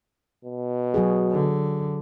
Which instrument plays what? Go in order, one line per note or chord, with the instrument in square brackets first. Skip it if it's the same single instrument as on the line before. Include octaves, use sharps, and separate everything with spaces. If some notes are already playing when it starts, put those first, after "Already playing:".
[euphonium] B2
[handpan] F#3 F#4 G#4
[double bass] D3